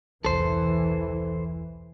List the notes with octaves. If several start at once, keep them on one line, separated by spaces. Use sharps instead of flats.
E1 C2 E3 A4 C5